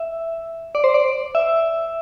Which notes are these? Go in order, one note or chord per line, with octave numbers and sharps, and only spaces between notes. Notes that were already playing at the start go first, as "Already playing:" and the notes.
Already playing: E5
D5
C5
D5
E5